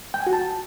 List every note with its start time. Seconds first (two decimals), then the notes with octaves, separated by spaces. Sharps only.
0.14 G5
0.20 G#5
0.27 F#4
0.33 A5